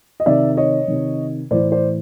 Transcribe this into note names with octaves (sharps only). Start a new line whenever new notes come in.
D#5
C3 D#3 D5 E5
C#5 D#5
C3 D#3
A2 E3 C5 D5
C5 D5